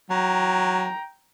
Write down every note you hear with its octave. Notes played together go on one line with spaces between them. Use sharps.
F#3 G5 A#5